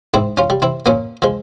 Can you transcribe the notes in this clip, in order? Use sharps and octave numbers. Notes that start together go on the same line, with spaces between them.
G#2 C4 E4
C#4 F4
G3
C4 E4
A#2 A#3 C#4
F3 G#3